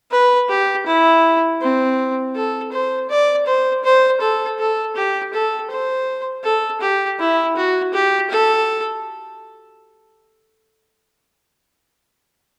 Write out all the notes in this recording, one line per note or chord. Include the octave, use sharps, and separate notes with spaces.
B4
G4
E4
C4
A4
C5
D5
C5
C5
A4
A4
G4
A4
C5
A4
G4
E4
F#4
G4
A4